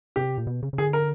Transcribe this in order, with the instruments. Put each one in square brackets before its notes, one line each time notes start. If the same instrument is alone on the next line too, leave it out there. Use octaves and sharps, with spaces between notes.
[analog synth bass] C3 [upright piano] G4
[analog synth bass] A#2
B2
C#3
C#3
[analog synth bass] D3 [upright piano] G#4
[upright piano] A#4